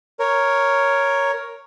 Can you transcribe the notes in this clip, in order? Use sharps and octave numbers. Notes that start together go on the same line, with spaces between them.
A#4 C#5